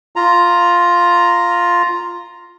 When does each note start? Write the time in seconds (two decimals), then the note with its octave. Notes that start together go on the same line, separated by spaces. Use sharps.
0.16 F4 A#5